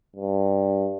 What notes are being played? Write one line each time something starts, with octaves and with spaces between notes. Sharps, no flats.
G2